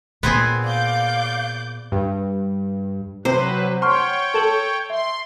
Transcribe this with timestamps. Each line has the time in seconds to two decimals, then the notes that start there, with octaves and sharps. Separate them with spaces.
0.23 A#2 B3 C4 G#4
0.64 D5 F5 D6 G6
1.92 G2
3.25 C3 F#3 B4 C5
3.82 C#5 F#5 G5 C6 C#6 F6
4.34 A4 A5 E7 F#7
4.90 E5 C6